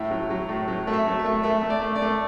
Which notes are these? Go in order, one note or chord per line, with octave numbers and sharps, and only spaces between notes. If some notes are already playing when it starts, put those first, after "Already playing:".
Already playing: A2 E4
F#3
F#3
A2
F#3
A3
E5
F#3
E5
A3
A3 E5
A3
D5
A3
D5
A3